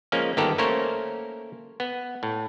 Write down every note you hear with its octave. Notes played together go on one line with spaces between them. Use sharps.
F3 G#3 A#3 C#4
G1 D#3 B3 G4 A4 A#5
A3 A#3 C#4 A#4 C5 C#5
B3
A2